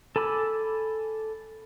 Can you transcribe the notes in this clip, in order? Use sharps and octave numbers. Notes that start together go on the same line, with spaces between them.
A4 G#5 B5 D6 E6